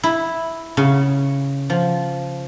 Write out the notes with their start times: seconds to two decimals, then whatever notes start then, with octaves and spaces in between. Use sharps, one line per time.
0.03 E4
0.77 C#3
1.70 F3